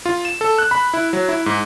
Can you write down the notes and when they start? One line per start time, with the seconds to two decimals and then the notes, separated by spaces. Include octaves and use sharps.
0.06 F4
0.25 E7
0.41 A4
0.58 F#6
0.71 B5
0.94 E4
1.13 F#3
1.29 E4
1.46 G#2